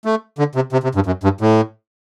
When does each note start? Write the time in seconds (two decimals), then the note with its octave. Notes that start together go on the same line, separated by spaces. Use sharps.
0.05 A3
0.39 D3
0.55 C3
0.73 C3
0.83 C3
0.95 G2
1.06 F#2
1.23 G2
1.41 A2